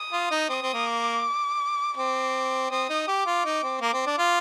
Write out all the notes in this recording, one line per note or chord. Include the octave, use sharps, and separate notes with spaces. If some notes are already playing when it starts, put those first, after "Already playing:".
Already playing: D#6
F4
D#4
C4 D#6
C4
A#3
D6
C4 D6
C4 D#6
D#4
G4 D6
F4
D#4
C4
A#3 D6
C4
D4
F4